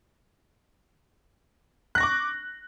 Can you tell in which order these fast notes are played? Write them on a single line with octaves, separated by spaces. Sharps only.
F#6 A#6 C#6 D6